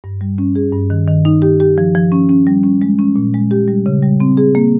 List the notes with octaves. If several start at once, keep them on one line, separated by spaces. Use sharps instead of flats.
G2
G3
C#4
G#4
G2
D#3
D#3
D#4
G4
G4
F3
F3
C#4
C#4
G3
C#4
G#3
C#4
A#2
G#3
G4
G3
C#3
G3
C4
G#4
A#3